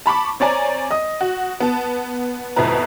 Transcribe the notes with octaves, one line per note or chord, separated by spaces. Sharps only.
A5 B5 C#6 D6
C4 C#5 D5 G#5 A#5
D#5 D#6
F#4
B3 A5
G#1 F2 B2 E4 B4 A#5